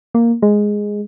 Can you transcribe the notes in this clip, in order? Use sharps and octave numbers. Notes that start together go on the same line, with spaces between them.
A#3
G#3